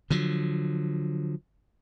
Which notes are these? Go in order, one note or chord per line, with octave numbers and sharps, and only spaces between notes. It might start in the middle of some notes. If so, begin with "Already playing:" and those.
D3 F3 F#3